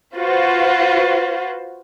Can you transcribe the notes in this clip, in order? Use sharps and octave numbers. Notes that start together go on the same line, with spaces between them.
F4 F#4 B4 C5